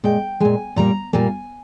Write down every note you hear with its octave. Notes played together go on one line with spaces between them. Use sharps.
A#2 G#3 G5
A#2 G#3 G#5
A#2 G3 A#3 A#5
A#2 G3 A#3 G#5